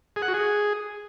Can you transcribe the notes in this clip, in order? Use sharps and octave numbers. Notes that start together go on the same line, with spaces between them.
G#4
F#5
F#4
G#4